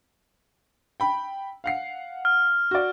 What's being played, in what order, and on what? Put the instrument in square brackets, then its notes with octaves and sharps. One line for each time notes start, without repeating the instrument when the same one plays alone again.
[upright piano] G5 B5
F5 F#5 C7
[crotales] F6
[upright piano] F#4 D5